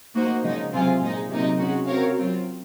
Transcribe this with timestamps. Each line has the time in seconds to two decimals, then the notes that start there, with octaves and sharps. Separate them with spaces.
0.14 A#3 D#4 F#4 C5
0.44 C#3 F3 G#3 D#4
0.72 C3 F#3 C4 F4 G#4
1.01 A#2 G#3 D#4
1.29 C3 F#3 A#3 D#4
1.59 C#3 G#3 C#4 F#4
1.87 C4 F#4 A#4 C#5 F5
2.17 F#3 C4 F4